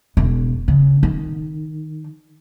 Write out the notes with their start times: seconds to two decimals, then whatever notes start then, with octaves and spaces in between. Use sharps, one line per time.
0.17 E1
0.68 C#3
1.03 D#3